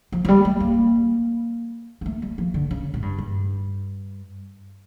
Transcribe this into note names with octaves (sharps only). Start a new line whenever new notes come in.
F3
F3
G3
A3
A#3
A#3
A3
G3
F3
D3
C#3
A2
G2
G2